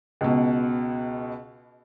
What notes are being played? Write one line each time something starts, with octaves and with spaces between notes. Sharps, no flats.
C#2 B2